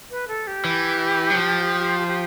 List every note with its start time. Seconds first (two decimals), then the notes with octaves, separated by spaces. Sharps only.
0.11 B4
0.28 A4
0.47 G4
0.65 E3
1.31 F#3
1.36 F3
2.08 G4